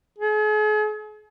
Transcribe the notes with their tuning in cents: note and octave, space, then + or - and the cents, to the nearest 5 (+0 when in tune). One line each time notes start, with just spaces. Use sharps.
G#4 +40